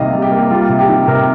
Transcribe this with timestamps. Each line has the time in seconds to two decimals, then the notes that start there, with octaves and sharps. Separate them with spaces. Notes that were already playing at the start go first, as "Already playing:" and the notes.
Already playing: C3 D#3 G3 A#3 D#5 F5
0.13 G3
0.22 G4
0.31 A#3
0.50 G3 F4
0.69 C3
0.79 G4
0.88 D#3
1.07 C3 A#4